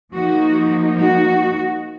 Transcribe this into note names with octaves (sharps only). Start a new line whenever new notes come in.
F3 A#3 D#4 F#4
F#4